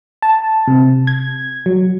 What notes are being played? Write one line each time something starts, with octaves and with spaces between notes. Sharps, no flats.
A5
C3
G#6
F#3